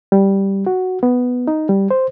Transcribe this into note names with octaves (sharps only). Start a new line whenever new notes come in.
G3
F#4
B3
D#4
G3
C5